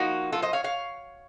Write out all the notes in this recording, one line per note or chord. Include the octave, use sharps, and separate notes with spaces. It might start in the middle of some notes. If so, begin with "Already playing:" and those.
Already playing: F3 A#3 D#4 F#4
F4 A4
C5 D#5
C#5 F5
C#5 F5